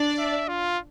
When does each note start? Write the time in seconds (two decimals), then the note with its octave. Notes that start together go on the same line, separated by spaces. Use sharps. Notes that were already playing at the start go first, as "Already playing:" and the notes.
Already playing: D4 D5
0.19 E5
0.48 F4